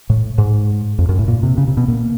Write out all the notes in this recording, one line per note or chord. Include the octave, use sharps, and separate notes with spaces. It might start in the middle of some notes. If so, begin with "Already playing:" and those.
A2
G#2
F2
F#2
A2
A#2
C3
C#3
C3
B2
A#2